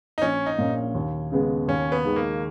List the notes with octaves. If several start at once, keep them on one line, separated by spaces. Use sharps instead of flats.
D#4
A#1 C#4
D#4
A#2 A#3 C#4
D#2
C#3 G#3 B3
D#2 C#4
B3
D#3 G#3
A#3